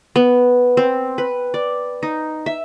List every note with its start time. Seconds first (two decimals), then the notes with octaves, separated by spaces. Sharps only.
0.16 B3
0.77 C4
1.18 B4
1.54 D5
2.03 D#4
2.46 E5